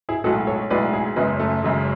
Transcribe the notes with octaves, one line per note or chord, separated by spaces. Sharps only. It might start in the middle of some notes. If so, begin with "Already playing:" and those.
E4 G#4
B1 A2 G#3 F#4 A4
A4 C#5
B1 A2 G#3 B4 D5
E4 G#4
F#1 F#2 C#3 G#3 B3
A3
F#1 F#2 C#3 G#3